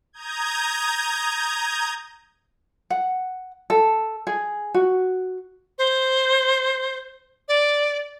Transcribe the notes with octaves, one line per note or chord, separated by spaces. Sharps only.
A#5 D#6 G6 G#6
F#5
A4
G#4
F#4
C5
D5